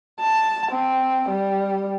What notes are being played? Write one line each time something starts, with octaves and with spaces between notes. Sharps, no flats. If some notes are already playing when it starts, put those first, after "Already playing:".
A5
C4
G3